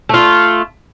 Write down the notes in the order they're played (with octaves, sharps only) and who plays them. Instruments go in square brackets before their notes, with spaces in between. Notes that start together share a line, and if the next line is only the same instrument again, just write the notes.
[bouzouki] A3 F4